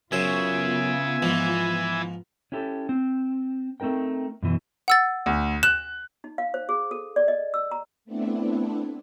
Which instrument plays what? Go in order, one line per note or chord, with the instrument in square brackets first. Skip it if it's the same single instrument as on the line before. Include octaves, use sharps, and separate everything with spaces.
[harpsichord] F#2 C5 [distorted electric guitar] C#3 [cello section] B3 F4 [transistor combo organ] E5 G#5
[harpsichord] G#2 F3 [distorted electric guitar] E3
[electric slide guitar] C#4 E4 G4 A4
C4
A3 C4 D#4 A#4 G5
F#2 B2 E3 F#3
[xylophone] F#5 E6 A6
[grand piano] D2
[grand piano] F#6 [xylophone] E7
[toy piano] D#4
F5
C5
G#4
A4
D5
D#5
E6
A#5
[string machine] A3 B3 C4 D4 E4